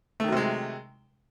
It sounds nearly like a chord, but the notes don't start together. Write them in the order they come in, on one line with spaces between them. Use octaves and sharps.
A3 D#3 F#3 C3 G#3